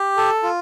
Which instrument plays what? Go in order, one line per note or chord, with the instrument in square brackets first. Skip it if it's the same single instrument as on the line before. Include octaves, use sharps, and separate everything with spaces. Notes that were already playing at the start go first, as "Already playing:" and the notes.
Already playing: [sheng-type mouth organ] G4
A4
F4